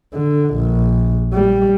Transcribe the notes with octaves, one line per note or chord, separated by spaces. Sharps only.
D3
A#1
G3